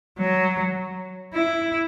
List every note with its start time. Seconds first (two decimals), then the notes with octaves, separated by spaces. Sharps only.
0.18 F#3
1.34 E4